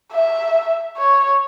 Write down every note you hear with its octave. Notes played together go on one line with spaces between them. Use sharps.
E5
C#5